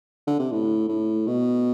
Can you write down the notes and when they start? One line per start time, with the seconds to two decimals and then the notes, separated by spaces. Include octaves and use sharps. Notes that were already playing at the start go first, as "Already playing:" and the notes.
0.27 D3
0.39 C3
0.52 A2
0.88 A2
1.27 B2